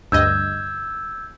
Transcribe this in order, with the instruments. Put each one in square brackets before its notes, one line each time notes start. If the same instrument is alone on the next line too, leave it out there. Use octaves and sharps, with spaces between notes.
[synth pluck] D2 G2 D#5 [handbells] E6 G6 G#6